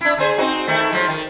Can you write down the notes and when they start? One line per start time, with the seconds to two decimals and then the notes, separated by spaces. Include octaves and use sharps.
0.01 D4 E4
0.17 D3 G#4 C5
0.38 C4 D#4 F#4
0.67 D#3 A3 E4
0.91 G#2 F3 F#3
1.08 D#3